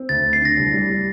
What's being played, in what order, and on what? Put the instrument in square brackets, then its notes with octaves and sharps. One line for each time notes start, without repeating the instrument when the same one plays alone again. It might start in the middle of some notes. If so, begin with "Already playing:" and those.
Already playing: [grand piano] C4
[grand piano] D2 [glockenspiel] A6
[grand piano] D2
[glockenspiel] C7
[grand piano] D3 [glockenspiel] A#6
[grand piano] C2
G3
G3